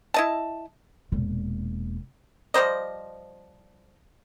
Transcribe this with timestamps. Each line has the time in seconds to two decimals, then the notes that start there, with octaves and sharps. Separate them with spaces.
0.14 E4 D#5 A5
1.12 E1 A#2
2.54 F3 G3 C5 D#5